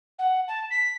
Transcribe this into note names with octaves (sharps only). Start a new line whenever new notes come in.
F#5
A5
B6